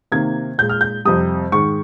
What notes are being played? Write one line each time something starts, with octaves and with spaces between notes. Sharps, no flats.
C3 D#3 A#3 G#6
A#2 G#3 G6
F6
G6
F2 C3 G3 D#6
G#2 D#3 G#3 C#6